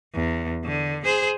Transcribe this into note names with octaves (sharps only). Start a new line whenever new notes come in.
E2
D3
G#4 C5